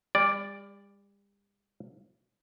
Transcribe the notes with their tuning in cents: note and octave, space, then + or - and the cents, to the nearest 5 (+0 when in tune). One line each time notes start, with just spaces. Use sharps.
G3 +40 D5 +0